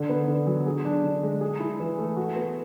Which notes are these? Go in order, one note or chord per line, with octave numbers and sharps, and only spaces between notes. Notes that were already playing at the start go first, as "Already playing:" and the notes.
Already playing: D3
B3
D3
F#3
G#4
D4
D3
G#3
G#4
E4
E3
A3
F#4
B3